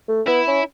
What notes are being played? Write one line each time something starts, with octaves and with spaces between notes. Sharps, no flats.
A3
B3 E4
C#4